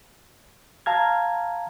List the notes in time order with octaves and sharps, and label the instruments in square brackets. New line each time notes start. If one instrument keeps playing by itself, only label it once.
[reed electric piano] F5 A5 A#5 F6 G#6